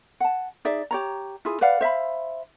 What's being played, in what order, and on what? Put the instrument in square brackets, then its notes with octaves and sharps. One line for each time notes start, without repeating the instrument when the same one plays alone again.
[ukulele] F#5 A5
D#4 G#4 D5 E5
G4 C#5 A#5
E4 F4 G#4
B4 D5 F5 F#5
C5 E5 F5 B5